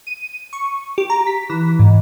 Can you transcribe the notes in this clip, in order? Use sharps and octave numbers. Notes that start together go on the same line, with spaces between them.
D#7
C#6
G4
A#5
B6
E3
G#2